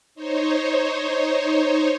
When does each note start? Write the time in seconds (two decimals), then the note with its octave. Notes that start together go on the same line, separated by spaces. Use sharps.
0.15 D#4 C5 C#5